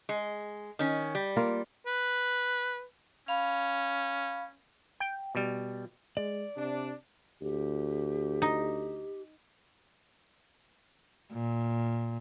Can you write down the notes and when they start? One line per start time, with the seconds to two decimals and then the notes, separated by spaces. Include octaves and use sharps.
0.09 G#3
0.79 D#3 C#4
1.15 G3
1.36 A#3 F4
1.87 B4
3.28 C#4 F5 B5
5.00 G5
5.35 B2 G3
6.17 G#3 D5
6.57 C3 D4
7.41 D2 G4
8.42 D#4
11.32 A#2